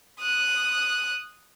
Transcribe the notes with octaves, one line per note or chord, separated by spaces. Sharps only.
D#6 F#6